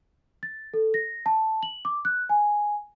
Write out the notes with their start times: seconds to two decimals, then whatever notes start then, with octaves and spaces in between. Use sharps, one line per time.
0.43 A6
0.74 A4
0.94 A#6
1.26 A5
1.63 F#7
1.85 D6
2.05 F#6
2.29 G#5